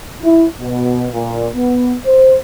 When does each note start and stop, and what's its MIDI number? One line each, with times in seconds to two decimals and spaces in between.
0.23 0.46 64
0.60 1.07 47
1.12 1.47 46
1.55 1.95 59
2.06 2.35 72